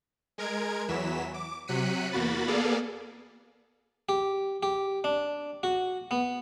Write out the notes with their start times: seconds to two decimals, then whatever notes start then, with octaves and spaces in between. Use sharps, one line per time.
0.38 G#3 A#4 G#6 D7
0.88 E2 E3 F#3 B6 E7
1.34 D6
1.67 C3 F#3 F#6 B6 C#7 D#7
2.12 E2 A#3 F#4 B5 A6
2.48 A#3 B3 G#4 A4 D5 F5
4.09 G4
4.63 G4
5.04 D4
5.63 F#4
6.11 B3